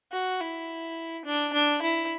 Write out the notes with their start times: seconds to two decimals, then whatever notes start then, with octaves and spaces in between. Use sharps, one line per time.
0.12 F#4
0.41 E4
1.25 D4
1.53 D4
1.82 E4